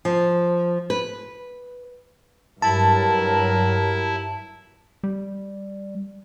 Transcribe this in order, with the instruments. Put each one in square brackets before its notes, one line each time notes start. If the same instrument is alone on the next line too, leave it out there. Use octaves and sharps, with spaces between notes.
[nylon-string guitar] F3
B4
[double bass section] G2 F#3 [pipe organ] E4 [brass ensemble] G4 A#4 [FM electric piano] A5
[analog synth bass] G3